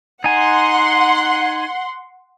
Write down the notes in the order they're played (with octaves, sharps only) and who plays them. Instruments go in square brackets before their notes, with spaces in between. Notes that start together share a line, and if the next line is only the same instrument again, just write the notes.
[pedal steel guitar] D#4 G#5 [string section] F#5 C6